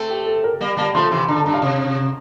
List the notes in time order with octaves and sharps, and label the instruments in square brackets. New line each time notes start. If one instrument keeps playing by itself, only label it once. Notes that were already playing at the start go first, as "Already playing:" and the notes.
Already playing: [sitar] A3 C4 [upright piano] A4
[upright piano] G4
A4
A#4
[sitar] G3 A#3
[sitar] G3 A#3 [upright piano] A5
[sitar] F3 A3 [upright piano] C6
[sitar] C3 E3 [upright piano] C6
[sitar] D3 [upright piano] A#5
[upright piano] A5
[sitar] G2 [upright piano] A#5
[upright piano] F5
[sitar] C3